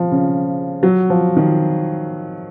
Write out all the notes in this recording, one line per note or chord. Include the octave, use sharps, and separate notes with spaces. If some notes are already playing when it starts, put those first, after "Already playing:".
Already playing: F3
C#3
F#3
F3
D#3